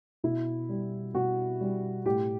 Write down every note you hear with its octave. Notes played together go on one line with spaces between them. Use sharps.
B2 E4
G3
B2 F#4
G3
A2 G4